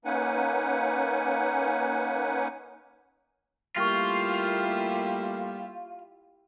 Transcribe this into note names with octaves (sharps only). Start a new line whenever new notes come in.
A#3 C#4 D#4 B4 F#5 G#5
G3 A3 A#3 E4 F4 G4 G5 C#6